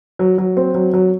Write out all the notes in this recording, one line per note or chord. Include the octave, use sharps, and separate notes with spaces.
F#3
F#3
C4
F#3
F#3